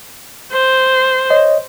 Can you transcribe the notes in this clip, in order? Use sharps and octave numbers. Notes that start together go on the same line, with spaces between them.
C5
C#5 D#5